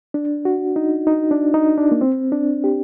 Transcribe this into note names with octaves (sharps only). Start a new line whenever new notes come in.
D4
F#4
D#4
D#4
D4
D#4
D4
A#3
C4
D4
G4